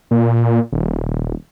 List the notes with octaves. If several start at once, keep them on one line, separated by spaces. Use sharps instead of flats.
A#2
D#1